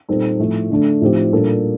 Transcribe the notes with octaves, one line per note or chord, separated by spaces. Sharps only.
A#2 G3 C4 D#4 A4
A2 F3 A3 C4
D3 A3 D4 A4
A2 F3 C4 D#4 G4
A#2 G3 A#3 D4 A4